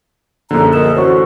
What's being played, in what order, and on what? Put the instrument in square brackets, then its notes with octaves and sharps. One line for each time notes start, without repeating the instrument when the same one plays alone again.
[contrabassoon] A#1 [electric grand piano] F#2 D3 [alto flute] A#5
[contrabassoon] A#1 [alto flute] A#4 [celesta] D#5 D#6 E7
[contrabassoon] A1 [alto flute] F#4 [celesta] C5 C#5 C#6